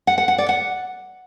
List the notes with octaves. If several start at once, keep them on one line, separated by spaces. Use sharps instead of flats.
F#5
F#5
F#5
D5
F#5